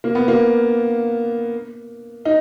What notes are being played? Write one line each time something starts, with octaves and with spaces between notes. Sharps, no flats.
A#3
B3
A#3
D#4